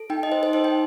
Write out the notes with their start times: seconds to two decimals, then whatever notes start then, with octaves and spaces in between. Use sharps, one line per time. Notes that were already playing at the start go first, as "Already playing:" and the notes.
Already playing: A4
0.10 D#4 G5
0.23 D#5
0.32 D#4 C5
0.43 C5
0.53 D#4 C5
0.64 G5